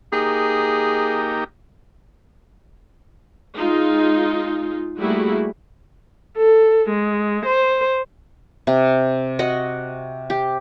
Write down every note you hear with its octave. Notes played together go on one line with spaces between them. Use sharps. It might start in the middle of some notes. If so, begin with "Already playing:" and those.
A#3 D#4 G4 G#4
G#3 D#4 F4
G3 A3 A#3 E4 F#4 G#4
A4
G#3
C5
C3
F#4 D#5 F#5
G4